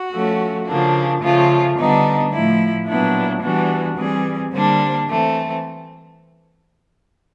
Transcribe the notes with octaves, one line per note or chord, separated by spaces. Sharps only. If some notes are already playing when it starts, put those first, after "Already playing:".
Already playing: F#4
F3 A3 C#4
C#3 F3 A#3 D4
C#3 F3 A3 F4
D3 G3 B3 D4 D#4
A2 F3 A3 E4
A#2 F#3 B3 D4 E4
E3 G3 B3 D4 F#4
E3 G3 C4 G#4
D3 G3 A#3 D4 C5
E3 A3 C4